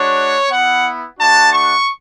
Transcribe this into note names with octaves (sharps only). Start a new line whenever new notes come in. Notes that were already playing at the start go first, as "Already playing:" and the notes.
Already playing: G#3 D4 F#4 C#5
B3 E4 F#5
A3 D4 F#4 A5
C#6